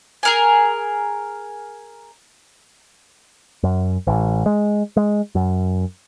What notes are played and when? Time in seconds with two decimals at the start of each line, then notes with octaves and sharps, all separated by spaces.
0.23 G#4 A#4 G#5
3.63 F#2
4.07 A1
4.46 G#3
4.97 G#3
5.35 F#2